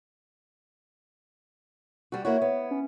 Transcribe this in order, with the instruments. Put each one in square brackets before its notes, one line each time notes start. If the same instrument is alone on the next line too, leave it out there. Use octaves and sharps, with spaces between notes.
[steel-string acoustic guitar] G3 F#4
[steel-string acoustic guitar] A#3 E4 F#4 [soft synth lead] C#5
[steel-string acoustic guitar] B3 [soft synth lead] C#5
[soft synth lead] C#4